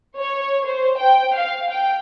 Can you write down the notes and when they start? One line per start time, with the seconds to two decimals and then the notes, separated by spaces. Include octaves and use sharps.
0.20 C#5
0.66 C5
0.99 G5
1.36 F5
1.71 G5